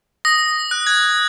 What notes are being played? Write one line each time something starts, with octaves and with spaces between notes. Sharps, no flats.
D#6 A#6
F#6
G#6